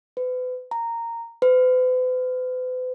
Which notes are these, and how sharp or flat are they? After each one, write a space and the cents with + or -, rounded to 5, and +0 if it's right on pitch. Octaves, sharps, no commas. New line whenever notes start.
B4 +35
A#5 -10
B4 +45